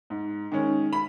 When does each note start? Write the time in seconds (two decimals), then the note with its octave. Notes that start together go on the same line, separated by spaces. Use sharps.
0.10 G#2
0.52 D#3 G#3 C#4
0.93 B5